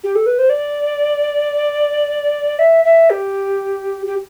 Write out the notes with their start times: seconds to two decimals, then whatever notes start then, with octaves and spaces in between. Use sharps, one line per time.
0.04 G4
0.15 A4
0.26 B4
0.39 C5
0.50 D5
2.59 E5
2.85 E5
3.10 G4
4.06 G4